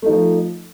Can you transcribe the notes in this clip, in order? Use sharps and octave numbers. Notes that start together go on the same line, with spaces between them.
F3 A3 D#4